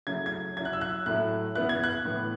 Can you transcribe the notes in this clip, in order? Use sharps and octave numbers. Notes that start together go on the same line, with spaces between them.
C#3 F#3 A3 E4 G#6
G#6
F#3 C#4 E4 G#6
F#6
E6
F#6
A2 F#3 A3 E4 F#6
C#3 E3 B3 E4 F#6
G#6
F#6
A2 E3 B3